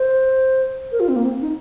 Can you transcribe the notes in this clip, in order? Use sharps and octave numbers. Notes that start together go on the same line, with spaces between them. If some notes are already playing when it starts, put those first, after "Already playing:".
Already playing: C5
A#4
F4
C4
A#3
C4
D#4